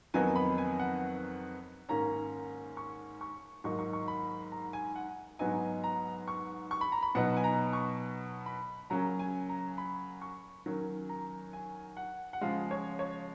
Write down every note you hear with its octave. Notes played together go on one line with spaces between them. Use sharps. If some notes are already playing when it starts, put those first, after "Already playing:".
F2 D#3 F#3 B3 D#4 G#5
B5
G#5
F#5
G#2 D#3 A#3 C#4 A#5
C#6
C#6
G#2 D#3 F#3 A#3 D#4 C#6
C#6
C#6
B5
A#5
G#5
F#5
G#2 F#3 B3 D#4 G#5
A#5
C#6
C#6
B5
A#5
B5
B2 F#3 B3 D#4 F#5
G#5
A#5
C#6
B5
C#3 F#3 A#3 C#4 A#5
G#5
A#5
B5
C#6
D#3 F#3 C#4
A#5
G#5
F#5
F#5
C#3 F3 G#3 F5
C#5
C#5